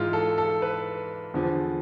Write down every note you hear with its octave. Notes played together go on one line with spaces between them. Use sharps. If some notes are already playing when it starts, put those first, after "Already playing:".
Already playing: G#2 E3 F4
A4
A4
B4
E2 D3 F3